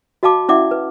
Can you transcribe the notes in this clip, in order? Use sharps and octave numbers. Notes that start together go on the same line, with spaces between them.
F#4 D#5 F5 A5 D6
C#4 E4 D5 E5 F#5 D6
B4